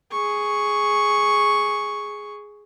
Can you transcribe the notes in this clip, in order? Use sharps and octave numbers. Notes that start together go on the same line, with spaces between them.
G#4 C#6